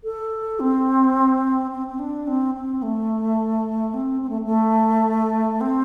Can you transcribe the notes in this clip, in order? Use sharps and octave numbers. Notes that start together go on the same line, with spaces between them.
A4
C4
C4
C4
D4
C4
C4
A3
C4
C4
A3
A3
C4